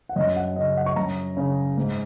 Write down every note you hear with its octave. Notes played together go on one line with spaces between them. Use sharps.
F#5
F#2 D#5
F#5
C#3 D#5
F#5
C#6
F#2 A#5
C#3
G#2